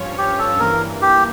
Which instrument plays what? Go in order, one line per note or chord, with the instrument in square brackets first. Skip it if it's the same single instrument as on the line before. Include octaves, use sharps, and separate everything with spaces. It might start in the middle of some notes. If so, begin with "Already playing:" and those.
Already playing: [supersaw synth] G2 F3 C#4 F4 C#5
[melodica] G4
A4
[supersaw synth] G2 E3 A#3 [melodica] A#4
[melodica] G4